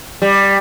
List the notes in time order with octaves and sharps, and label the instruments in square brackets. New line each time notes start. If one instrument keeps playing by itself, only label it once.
[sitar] G3